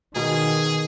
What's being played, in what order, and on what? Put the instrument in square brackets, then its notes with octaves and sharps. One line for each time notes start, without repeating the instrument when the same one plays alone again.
[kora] B2 [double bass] D#3 [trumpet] G#4